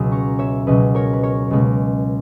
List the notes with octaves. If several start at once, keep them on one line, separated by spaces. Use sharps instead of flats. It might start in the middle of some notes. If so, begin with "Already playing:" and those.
Already playing: C#2 B2 F#3 D#6
A#5 C#6
C#5 E5
C#2 B2 F#3 B4 D#5
A#4 C#5
B4
A#4 C#5
C#2 B2 G#3